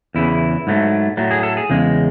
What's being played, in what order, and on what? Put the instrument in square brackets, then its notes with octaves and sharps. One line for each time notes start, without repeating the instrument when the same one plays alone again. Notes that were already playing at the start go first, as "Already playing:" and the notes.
[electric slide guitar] E2 C#3 E3 E4
G#2 F#3 A3
A2 F#3 A3
G#4
A4
G#4
E2 C#3 G#3